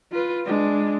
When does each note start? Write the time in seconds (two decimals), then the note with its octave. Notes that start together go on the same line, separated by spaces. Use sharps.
0.12 F4 B4
0.46 G#3 D4